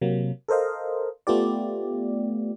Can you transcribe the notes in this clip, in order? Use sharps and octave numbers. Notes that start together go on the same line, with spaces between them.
C3 F#3 A#3
A4 A#4 C5 D#5 F5
A3 B3 F4 G4 D5